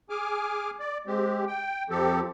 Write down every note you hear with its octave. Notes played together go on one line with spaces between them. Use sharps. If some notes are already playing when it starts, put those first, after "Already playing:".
G#4 G#5 D6 F6
D5
G#3 C4 G4
G5
F2 F3 C4 G4 A4